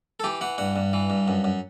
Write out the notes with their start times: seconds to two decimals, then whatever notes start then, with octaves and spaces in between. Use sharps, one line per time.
0.20 A4
0.24 E3 G4
0.41 E3 F#5
0.58 G2 F#5
0.76 G2
0.93 E3
1.10 G2
1.28 F#2
1.44 F#2